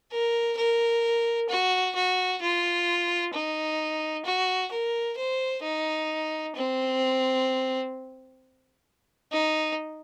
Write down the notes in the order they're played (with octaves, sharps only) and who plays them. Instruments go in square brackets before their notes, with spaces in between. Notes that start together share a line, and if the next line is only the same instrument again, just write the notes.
[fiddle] A#4
A#4
F#4
F#4
F4
D#4
F#4
A#4
C5
D#4
C4
D#4